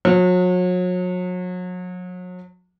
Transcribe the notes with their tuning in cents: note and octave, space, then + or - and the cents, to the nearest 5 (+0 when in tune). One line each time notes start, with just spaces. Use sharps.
F#3 -35